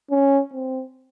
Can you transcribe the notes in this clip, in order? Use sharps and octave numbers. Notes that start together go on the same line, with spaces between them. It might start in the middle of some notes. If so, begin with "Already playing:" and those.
C#4
C4